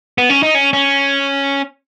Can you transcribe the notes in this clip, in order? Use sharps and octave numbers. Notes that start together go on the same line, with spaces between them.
B3
C#4
D#4
C#4
C#4